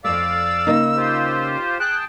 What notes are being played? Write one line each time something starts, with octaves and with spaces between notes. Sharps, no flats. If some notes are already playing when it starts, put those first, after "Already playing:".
F2 A3 D5 F5 D6 E6
C#3 A#3 D#4
F4 G4 C5
G#4 G5 A5 F#6